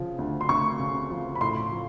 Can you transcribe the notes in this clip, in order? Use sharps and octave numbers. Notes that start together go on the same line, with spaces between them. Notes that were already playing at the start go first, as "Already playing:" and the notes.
Already playing: C#3 F3
D2
C6
D2 C#6
C#3
F3
B5
A2 C6
F3